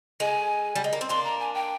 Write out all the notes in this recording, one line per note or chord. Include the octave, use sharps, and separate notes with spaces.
G#3 G#5
G3
G#3
A#3
C4
A#3 D4 C6
A#5
G#5
G5